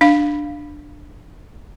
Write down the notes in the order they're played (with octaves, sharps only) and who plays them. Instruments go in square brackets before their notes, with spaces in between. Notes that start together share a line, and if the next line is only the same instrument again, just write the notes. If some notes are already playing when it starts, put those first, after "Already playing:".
[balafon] D4 F5